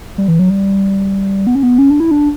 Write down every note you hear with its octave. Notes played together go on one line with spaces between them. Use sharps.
G3
E3
F#3
G3
B3
C#4
B3
C#4
D4
E4
D4